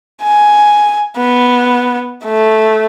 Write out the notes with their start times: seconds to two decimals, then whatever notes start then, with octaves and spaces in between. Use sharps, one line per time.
0.22 G#5
1.17 B3
2.24 A3